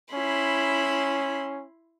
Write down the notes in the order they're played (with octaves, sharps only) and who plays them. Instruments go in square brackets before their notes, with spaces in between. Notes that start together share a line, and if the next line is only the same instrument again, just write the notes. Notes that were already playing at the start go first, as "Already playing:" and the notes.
[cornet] C#4 [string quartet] E4 B5 C6